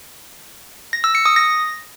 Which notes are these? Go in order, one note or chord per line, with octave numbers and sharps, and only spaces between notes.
A#6
E6
C#7
D#6
A#6